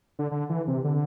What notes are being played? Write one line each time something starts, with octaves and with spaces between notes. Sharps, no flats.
D3
D3
E3
C3
D3